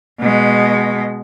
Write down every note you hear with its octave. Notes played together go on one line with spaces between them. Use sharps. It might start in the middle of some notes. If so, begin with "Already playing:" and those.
B2 G#3